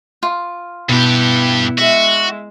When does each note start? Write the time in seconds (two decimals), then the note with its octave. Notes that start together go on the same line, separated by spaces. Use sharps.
0.23 F4
0.89 G2 B2 B3 E4 G4
1.78 G#3 F#4 E5